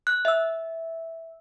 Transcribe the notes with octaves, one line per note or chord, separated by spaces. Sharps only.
F#6
E5 E6